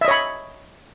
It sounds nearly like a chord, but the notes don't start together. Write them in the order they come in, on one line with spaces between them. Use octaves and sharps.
E5 D#5 C#5 B5